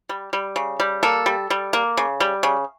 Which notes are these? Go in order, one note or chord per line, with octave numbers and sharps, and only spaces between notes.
G3
G3
C#3
G3
A#3 A4
G3
G3
A#3
C#3
G3
C#3